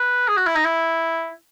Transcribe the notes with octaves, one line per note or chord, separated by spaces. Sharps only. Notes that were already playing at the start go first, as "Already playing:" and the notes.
Already playing: B4
G#4
F#4
E4
D#4
E4